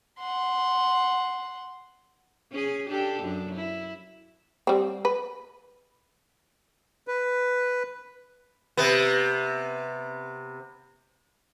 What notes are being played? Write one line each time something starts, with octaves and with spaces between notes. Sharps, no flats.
F#5 C6
C#4 G#4
D4 G4 A4
F#2 D4
E4
G3 C4
B4
B4
C3 B3